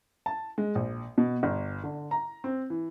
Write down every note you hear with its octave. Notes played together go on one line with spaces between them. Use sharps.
A5
G#3
A#1
B2
G1
D3
A#5
C4
E3